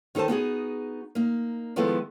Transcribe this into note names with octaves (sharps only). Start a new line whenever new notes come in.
D#3 D#4 A4 C5 A5
B3 D#4 F#4 G#4
A#3 D#4
D#3 F3 G#3 B3 E4 A4